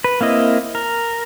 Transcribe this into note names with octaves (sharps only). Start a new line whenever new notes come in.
B4
A#3 C4 E4 D#5
A#4